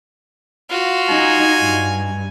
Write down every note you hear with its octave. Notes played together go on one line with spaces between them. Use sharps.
F4 F#4
D#4 G#5
G2